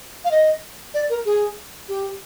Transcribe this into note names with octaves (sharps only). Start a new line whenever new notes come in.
F5
D#5
D5
A#4
G#4
G4